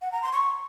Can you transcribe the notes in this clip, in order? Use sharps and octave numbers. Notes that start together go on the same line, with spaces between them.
F#5
A#5
C6
C#6